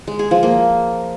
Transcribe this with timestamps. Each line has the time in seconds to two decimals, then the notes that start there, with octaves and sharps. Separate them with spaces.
0.07 G#3
0.19 G#4
0.31 F3
0.43 A#3